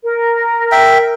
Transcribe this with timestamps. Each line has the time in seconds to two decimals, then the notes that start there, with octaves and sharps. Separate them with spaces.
0.02 A#4
0.72 E5 G5